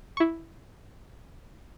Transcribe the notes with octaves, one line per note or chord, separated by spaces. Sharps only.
E4 C#6